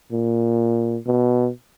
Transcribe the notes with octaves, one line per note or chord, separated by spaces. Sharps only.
A#2
B2